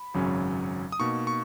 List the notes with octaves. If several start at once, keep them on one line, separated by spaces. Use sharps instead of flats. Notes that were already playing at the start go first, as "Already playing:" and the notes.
Already playing: B5
G#1 F#2 C#3 F#3 C#4
D#6
B2 A#3 D#4 C#6
C#6